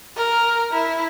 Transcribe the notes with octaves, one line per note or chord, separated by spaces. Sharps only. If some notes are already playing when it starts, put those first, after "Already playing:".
A#4
E4